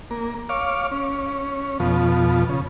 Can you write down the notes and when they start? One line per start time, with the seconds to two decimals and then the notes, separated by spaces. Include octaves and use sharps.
0.11 A#3
0.49 C#5 F5 D6
0.91 C#4
1.80 F2 B2 F3
2.49 C#3